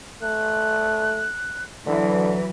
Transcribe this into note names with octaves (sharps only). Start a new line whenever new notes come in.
A3 F#6
D3 E3 F#3